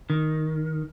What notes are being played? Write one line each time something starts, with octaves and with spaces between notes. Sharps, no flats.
D#3